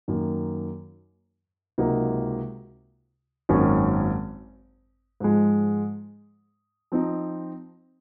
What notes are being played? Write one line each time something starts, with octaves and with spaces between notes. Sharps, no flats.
F#2 D#3 A#3
C#2 C3 F#3 A#3 D#4
G#1 F#2 D#3 A#3 C#4
G#2 F3 G#3
F3 C4 D#4